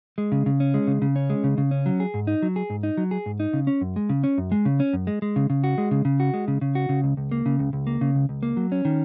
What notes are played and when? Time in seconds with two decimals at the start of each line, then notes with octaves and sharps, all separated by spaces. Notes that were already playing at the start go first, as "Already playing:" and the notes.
0.18 G#3
0.32 C#3
0.46 C#3
0.60 C#4
0.74 G#3
0.87 C#3
1.02 C#3
1.16 C#4
1.30 G#3
1.44 C#3
1.58 C#3
1.71 C#4
1.86 F#3
2.00 G#4
2.14 G#2
2.27 D#4
2.42 F#3
2.56 G#4
2.70 G#2
2.83 D#4
2.97 F#3
3.11 G#4
3.26 G#2
3.40 D#4
3.53 C#3
3.67 C#4
3.81 F#2
3.96 G#3
4.09 C#3
4.24 C#4
4.38 F#2
4.52 G#3
4.65 C#3
4.80 C#4
4.93 F#2
5.07 G#3
5.22 G#3
5.36 C#3
5.50 C#3
5.64 F#4
5.78 G#3
5.91 C#3
6.05 C#3
6.20 F#4
6.34 G#3
6.48 C#3
6.61 C#3
6.75 F#4
6.89 C#3
7.04 C#2
7.17 C#2
7.32 A#3
7.46 C#3
7.59 C#2
7.73 C#2
7.87 A#3
8.01 C#3
8.15 C#2
8.29 C#2
8.43 A#3
8.57 F#3
8.72 C#4
8.85 D#3